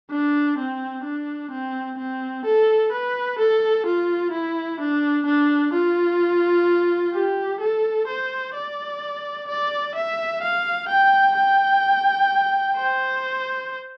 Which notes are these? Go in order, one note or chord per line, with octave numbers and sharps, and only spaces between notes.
D4
C4
D4
C4
C4
A4
B4
A4
F4
E4
D4
D4
F4
G4
A4
C5
D5
D5
E5
F5
G5
G5
C5